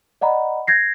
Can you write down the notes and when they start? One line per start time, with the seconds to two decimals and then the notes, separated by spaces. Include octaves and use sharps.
0.21 D5 D#5 F#5 A#5 B5
0.67 G6 G#6 A#6 C7